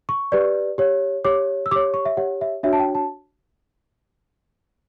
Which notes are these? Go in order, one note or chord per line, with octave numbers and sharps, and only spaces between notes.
C#6
G4 B4 D5
G4 C#5
G4 C#5 D6
E6
G4 C#5 D6
C#6
E5
G4 C#5 F#5
E5
D4 F#4 C#5 E5
A5
G5
A5